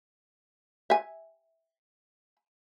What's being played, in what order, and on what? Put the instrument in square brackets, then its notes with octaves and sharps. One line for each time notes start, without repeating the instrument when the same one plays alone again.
[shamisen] E5 G#5